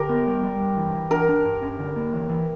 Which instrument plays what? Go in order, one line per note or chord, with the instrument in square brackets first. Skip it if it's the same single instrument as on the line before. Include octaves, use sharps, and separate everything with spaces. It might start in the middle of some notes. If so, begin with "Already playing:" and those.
Already playing: [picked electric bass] D3 [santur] G4 A#4
[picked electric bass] B3
G3
G3
G2
E3
E3
[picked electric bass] D4 [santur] A#4
[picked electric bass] D4
G2
C#4
D3
A#3
E3
E3